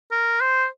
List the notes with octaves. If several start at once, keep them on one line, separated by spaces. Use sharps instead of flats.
A#4
C5